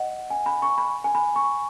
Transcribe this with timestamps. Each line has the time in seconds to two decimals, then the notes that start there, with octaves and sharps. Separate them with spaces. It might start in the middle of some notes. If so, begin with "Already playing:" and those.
Already playing: D#5 F#5
0.30 G#5
0.46 B5
0.62 C#6
0.78 B5
1.04 G#5
1.15 B5
1.36 C#6